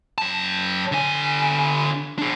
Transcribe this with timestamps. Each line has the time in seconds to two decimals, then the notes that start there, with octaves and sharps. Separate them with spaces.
0.18 F#2 A5
0.92 D3 G#5
2.18 D4 G#4